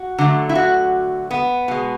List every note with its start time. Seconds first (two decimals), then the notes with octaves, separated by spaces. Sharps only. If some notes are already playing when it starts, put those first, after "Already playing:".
Already playing: F#4
0.18 D3 F#3 A3
0.49 E4
0.55 F#4
1.31 B3
1.68 B2 G#3